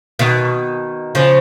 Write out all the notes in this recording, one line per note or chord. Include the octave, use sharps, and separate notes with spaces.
B2 D#3
C#3 F3